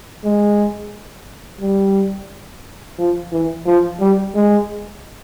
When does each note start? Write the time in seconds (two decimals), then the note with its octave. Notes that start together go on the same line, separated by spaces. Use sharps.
0.24 G#3
1.61 G3
2.98 F3
3.32 E3
3.66 F3
4.00 G3
4.35 G#3